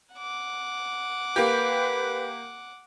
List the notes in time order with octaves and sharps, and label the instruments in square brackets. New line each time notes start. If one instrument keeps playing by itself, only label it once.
[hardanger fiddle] F#5 D6
[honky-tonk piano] A#3 G4 [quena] B4